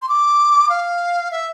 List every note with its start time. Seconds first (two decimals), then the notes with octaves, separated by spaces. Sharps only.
0.02 C6
0.09 D6
0.69 F5
1.31 E5